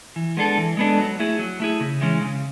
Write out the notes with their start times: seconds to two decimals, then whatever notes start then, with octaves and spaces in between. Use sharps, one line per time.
0.16 E3
0.37 G#3 B3 D4 A4
0.58 E3
0.77 G#3 B3 D4 A4
0.98 F#3
1.19 A3 E4 G#4
1.39 F#3
1.60 A3 E4 G#4
1.80 C#3
2.01 E3 G#3 C#4
2.21 C#3